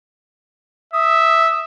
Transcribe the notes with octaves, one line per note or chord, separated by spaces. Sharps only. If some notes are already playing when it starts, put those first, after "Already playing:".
E5 D#6